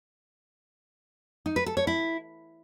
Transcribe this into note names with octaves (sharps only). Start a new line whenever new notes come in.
D#4
B4
A4
C#5
E4